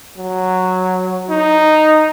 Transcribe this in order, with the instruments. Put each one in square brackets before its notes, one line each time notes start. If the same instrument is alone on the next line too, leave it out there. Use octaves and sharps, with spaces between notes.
[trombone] F#3
D#4